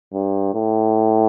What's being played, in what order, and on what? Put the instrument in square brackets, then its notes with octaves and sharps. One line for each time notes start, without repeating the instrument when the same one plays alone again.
[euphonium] G2
A2